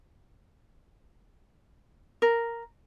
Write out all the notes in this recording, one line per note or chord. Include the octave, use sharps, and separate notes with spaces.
A#4